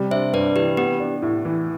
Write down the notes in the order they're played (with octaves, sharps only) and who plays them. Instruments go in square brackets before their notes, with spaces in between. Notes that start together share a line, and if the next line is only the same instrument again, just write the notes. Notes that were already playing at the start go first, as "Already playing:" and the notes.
Already playing: [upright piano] C3 G3
[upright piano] D4 [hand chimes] C5 E5
[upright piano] G2 [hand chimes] B4 D5
[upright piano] E3 [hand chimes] G4 B4
[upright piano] B3 [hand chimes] G4
[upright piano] D4
A2
E3